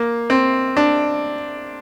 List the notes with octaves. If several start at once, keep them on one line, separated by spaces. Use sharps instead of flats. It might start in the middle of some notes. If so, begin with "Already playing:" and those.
Already playing: A#3
C4
D4